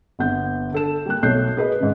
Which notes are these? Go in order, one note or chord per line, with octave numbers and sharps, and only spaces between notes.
G1 B3 G6
D3 A4 E7
G3 A#3 G4 F#6
B1 A3 C#5 F#6 G6 C7
G#4 B4 D#5
G#2 C#3